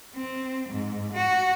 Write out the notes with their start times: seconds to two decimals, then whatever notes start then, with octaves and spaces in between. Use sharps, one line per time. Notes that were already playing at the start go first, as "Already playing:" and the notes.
0.15 C4
0.69 G#2
1.14 F#4